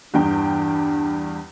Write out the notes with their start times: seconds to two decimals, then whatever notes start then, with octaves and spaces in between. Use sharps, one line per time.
0.14 E2 G2 D4 G5